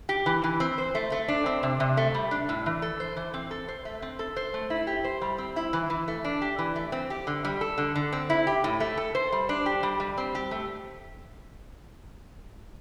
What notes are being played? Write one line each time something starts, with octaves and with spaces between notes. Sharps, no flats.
G4
E3
E3
C4
C5
A3
A3
D4
C4
C3
C3
A3
G3
D4
A2
E3
A4
C5
E3
C4
A4
C5
A3
C4
A4
C5
A3
E4
G4
C5
G3
C4
E4
E3
E3
A3
D4
G4
E3
A3
C4
G4
D3
G3
A4
D3
D3
C4
E4
G4
A2
A3
A4
C5
G3
D4
G4
G3
G3
C4
G4
A3